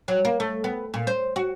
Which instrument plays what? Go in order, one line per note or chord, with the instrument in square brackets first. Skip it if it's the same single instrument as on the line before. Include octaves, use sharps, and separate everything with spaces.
[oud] F#3
A#3
A3
B3
A#2
C5
F#4